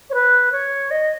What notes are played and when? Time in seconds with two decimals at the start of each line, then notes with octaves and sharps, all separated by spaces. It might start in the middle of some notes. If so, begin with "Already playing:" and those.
0.10 C#5
0.14 B4
0.52 C#5
0.91 D#5